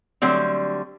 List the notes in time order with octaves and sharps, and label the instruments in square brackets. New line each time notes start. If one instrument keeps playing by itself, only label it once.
[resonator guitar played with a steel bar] D3 F#3 G3 A3 C4